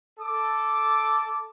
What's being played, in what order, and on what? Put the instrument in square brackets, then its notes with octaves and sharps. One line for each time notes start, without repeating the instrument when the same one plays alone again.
[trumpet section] A4 D6